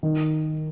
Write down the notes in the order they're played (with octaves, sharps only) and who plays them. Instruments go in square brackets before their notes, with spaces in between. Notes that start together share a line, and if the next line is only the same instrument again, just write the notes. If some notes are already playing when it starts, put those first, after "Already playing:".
[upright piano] D#3